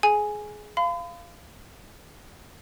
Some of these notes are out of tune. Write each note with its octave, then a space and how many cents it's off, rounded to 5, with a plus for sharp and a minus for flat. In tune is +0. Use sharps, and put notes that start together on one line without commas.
G#4 +20 G#5 +0
F5 -15 B5 +45